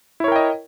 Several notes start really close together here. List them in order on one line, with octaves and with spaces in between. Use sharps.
E4 C#5 A#4 G5 D#5